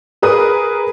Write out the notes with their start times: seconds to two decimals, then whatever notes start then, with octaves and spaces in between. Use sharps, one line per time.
0.22 G#4 A#4 B4 D#6